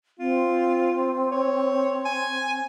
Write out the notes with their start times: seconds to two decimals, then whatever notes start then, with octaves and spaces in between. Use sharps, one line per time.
0.19 C4 F4
1.31 C#5
2.05 G#5